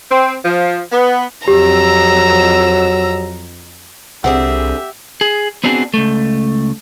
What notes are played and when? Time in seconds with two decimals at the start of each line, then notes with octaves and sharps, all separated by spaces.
0.10 C4
0.44 F3
0.91 B3
1.48 F2 F#3 G4 A#5 E6
4.24 C2 D3 C4 G4 G#4 E5 F#5
5.21 G#4
5.64 B3 C4 D4 F#4 G#4
5.94 C#2 A3